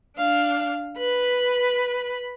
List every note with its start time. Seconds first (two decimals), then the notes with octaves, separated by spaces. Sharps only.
0.18 D4 F5
0.98 B4 B5